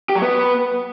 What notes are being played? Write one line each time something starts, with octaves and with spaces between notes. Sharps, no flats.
G4
F#3
B3